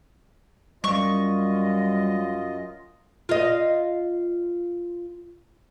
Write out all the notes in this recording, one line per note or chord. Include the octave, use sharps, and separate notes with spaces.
F#2 G3 F4 D#5 C#6
F4 D#5